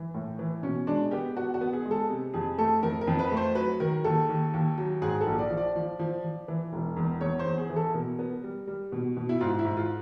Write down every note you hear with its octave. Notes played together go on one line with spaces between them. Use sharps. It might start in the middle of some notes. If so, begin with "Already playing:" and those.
Already playing: E3
A2
E3
B2 C#4
G#3 D4
B3 G4
B3 F#4
F#4
B3
G#4
G#3
A4
C3
F2 G#4
A3 A4
F2 A#4
A#4
F2
B4
A3
C5
F#3 B4
D#3 A#4
D#2 A4
D#2
D#2
F#3
G#2 G#4
A4
A#1
D5
F3
D5
F3
F3
F3
E3
E1
E2
E2 C#5
C5
E2
G#4
E3
A4
B2 A#4
B3
G3
G3
B2
B2
E4
G#2 F4
E4
G#2
F4